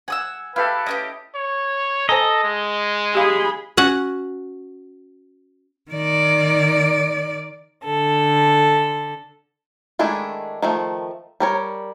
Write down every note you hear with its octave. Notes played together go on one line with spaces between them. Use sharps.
F#5 G#5 D#6 E6
E4 G4 A4 B4 F5
C#4 F#4 G4 D#5
C#5
A4 C5 D#5 G#5 A#5
G#3
G4 G#4 F5 B5
C#4 F#4 F#5
D#3 D5
D3 A4
D#3 G#3 A3 D4 E4
D#3 F3 A3
G3 A#4 C#5